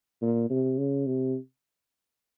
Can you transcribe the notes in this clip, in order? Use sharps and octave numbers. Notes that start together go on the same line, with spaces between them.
A#2
C3
C#3
C3